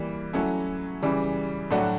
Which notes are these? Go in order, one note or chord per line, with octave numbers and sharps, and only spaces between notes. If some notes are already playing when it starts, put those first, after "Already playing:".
Already playing: E3 G3 A#3
F#3 A3 C#4 E4
C#3 E3 G3
A2 F#3 A3 D4 F#4